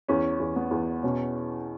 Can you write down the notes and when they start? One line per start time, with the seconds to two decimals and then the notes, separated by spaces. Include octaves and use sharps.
0.08 E2 C#4
0.40 E2
0.56 B3
0.71 E2
1.03 B2 C#4